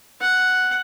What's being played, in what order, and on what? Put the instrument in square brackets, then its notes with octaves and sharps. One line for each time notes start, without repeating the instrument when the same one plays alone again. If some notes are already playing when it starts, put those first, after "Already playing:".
[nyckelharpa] F#5